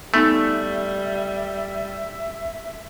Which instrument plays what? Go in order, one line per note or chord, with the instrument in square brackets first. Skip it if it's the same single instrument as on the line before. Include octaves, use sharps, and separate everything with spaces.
[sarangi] G3 [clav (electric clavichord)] A3 [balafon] B3 D#4 [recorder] E5